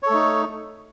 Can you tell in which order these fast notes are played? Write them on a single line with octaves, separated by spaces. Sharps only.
C#5 A4 A3 D#4